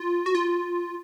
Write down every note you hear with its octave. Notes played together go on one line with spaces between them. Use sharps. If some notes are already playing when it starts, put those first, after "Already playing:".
Already playing: F4
F#4
F4